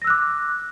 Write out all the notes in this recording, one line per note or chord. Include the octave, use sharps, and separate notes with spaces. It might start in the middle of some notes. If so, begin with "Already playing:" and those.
D6 E6 F#6 A#6